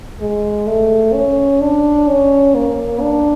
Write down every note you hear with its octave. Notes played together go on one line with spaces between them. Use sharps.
G#3
A3
C#4
D4
C#4
A#3
D4